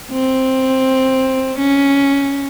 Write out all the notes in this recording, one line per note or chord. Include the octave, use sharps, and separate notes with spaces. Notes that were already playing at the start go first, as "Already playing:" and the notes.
C4
C#4